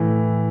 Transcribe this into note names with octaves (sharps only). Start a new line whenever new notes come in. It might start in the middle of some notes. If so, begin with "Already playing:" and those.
Already playing: A2 E3